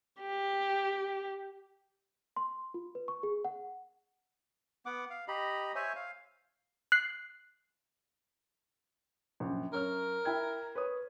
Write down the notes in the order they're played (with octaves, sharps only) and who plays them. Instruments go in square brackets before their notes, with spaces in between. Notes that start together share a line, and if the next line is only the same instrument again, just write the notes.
[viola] G4
[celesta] C6
F4
B4
C#6
G#4
F#5
[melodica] B3 F#5 D6
F5
G4 D#5 A#5 B5
C5 C#5 E5 G#5
F5
[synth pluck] F#6 C7
[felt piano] A#1 F#2
[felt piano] F#2 C#5 F6 [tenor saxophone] A#4
[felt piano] E4 G5 G#6
B4 C#5 D#6